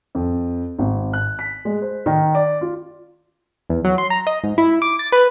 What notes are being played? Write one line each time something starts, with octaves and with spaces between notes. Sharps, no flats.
F2
G#1
F#6
B6
G#3
C5
D#3
D5
F4
E2
F#3
C6
A#5
D#5
G#2
E4
D6
A6
B4